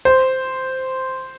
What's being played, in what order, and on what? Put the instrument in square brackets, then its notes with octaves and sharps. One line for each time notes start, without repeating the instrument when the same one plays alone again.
[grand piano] C5